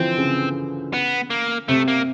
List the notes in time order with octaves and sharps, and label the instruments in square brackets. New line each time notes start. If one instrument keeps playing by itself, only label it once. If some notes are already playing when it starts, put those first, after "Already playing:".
Already playing: [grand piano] D3 E3 F3 [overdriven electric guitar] C4
[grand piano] C#3
[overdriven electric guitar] B3
A#3
[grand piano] C3 [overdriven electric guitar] A3
[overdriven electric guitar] A#3